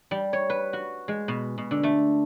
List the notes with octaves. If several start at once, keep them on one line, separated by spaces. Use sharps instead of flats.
G3
C#5
B4
F#4
G#3
B2
B2
D3
A3